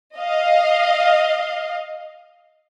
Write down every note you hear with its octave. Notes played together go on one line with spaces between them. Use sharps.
D#5 F5